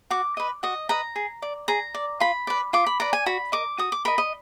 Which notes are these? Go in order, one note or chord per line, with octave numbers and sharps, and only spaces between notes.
F#4 D6
B4 D#5
F#4 D#5
B4 D#5 A#5
G#4
D5
G#4 A#5
D5
F4 B5
B4 D5
F4 D6
B5
B4 D5 A#5
G#5
F#4 B5
A#4 D#5 D6
F#4 D#6
D6
A#4 D#5 B5
D#5